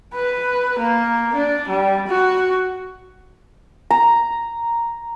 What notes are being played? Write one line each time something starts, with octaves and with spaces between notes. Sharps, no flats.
B4
A#3
D4
G3
F#4
A#5